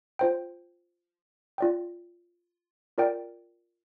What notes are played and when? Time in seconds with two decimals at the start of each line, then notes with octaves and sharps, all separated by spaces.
0.19 F4 C5 G5
1.58 F4 D5 G5
2.98 F4 A#4 D5 G5